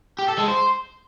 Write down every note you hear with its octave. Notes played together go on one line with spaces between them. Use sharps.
G4
A4
G#3
C5